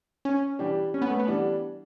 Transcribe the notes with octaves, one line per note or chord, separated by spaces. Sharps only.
C#4
E3 G3 D4 G4
C#4
B3
A3
B3
E3 G3 D4